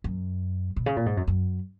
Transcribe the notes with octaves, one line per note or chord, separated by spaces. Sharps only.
F#2
B2
C#3
A#2
G#2
F#2
F#2